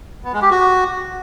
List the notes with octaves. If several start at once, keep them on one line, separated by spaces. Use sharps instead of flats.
B3
G#3
G4
F#4